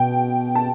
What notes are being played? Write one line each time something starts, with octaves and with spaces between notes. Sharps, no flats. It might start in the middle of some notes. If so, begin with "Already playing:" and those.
Already playing: B2 G5
A5